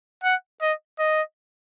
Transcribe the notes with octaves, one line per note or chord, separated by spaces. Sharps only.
F#5
D#5
D#5